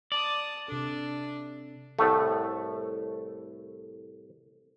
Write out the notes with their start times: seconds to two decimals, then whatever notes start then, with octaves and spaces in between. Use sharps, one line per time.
0.12 D5 A5 D#6
0.68 C3 D4 A4
1.99 C2 A2 A3